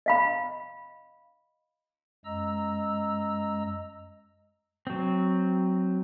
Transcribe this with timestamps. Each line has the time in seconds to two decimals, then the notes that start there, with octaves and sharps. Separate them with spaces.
0.06 D#5 F5 B5
2.25 F#2 G#3 D#5 A#5 E6
4.87 F#3 C4